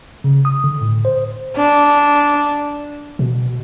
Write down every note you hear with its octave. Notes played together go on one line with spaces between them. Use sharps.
C#3
D#6
D3
A2
C5
D4
B2